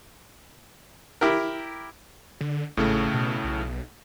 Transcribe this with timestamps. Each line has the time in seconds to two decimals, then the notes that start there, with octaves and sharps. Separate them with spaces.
1.21 E4 G4 A#4
2.41 D3
2.77 G#1 A2 C#3 A3
3.14 B2
3.44 B1